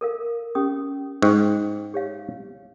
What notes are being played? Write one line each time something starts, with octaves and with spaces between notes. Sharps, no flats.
A4 A#4 F5
C#4 G4 D#6
G#2 G5 C#6
G4 C#5 F5